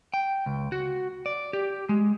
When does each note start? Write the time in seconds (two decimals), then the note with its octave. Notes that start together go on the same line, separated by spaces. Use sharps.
0.14 G5
0.46 C#2
0.72 F#4
1.26 D5
1.53 G4
1.89 G#3